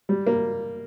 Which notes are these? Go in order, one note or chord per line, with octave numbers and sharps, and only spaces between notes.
G3
A#3